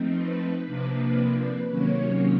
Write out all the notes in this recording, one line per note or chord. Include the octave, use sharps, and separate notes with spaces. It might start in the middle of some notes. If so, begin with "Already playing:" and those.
Already playing: F3 A3 C4 D#4
B4
C3 F3 A#3 D4
C3 D#3 F#3 A#3 C#4 C#5